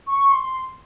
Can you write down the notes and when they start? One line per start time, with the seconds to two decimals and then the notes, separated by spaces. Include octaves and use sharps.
0.07 C#6
0.32 C6